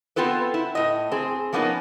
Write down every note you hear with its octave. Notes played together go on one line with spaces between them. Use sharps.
B3 C4 F4 A4 B4
E4
A2 D#5
C4 G#4
F3 A#3 B3 C#4 D#4